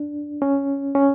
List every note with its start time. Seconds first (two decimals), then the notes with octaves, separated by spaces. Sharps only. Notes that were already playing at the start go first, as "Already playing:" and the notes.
Already playing: D4
0.42 C#4
0.95 C#4